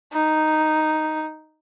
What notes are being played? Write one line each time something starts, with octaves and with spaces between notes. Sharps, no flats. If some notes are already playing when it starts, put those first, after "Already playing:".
D#4